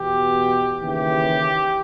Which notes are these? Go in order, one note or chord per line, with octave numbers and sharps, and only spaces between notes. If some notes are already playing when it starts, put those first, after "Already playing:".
Already playing: E2 B2 G4
D#2 C#3 E3 G4